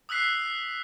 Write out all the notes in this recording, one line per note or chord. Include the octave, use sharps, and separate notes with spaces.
D#6 E6 F#6 B6 C7